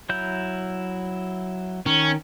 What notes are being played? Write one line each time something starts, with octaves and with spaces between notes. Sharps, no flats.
F#3 E4 G6
D#3 C#4